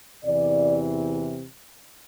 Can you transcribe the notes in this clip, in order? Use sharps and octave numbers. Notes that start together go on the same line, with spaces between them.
E2 C3 E3 D5